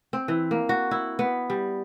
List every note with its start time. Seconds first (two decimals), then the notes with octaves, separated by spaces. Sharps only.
0.13 C4
0.28 E3
0.51 A#3
0.69 F#4
0.91 E4
1.19 B3
1.50 G3